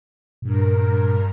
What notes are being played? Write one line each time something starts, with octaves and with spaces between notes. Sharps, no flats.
G2 A#2 A#4